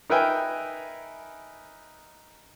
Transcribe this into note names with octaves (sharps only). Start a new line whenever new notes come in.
D#4 A#4 B4 E5 G5 G#5